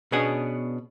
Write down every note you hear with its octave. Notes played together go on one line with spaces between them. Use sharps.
B2 B3 C#4 D4 G#4